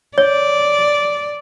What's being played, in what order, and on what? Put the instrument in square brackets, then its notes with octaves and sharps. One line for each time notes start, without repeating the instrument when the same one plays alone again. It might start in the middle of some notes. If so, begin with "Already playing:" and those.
[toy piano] C#5 [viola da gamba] D5